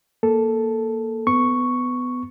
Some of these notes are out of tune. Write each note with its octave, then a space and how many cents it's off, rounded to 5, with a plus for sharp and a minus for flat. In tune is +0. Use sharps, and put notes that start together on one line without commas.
A#3 +0 A4 +0
B3 +20 C#6 +0